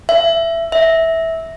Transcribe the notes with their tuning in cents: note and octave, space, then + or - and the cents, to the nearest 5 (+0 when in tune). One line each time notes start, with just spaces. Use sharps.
E5 +15
E5 -15